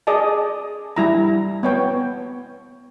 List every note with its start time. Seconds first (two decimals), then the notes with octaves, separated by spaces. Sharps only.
0.07 G#4 D5 D#5 A5
0.96 G3 E4 A#5
1.63 B3 C#5 G5